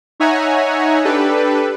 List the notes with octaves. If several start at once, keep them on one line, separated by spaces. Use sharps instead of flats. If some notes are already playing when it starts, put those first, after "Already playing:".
D#4 C#5 E5 F#5 G#5 A#5
D4 G4 A4 B4